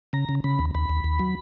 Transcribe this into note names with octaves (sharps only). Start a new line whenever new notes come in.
C#3 A#5
C#3
C#3 B5
D#2
D#2 B5
D#2
D#2
F#3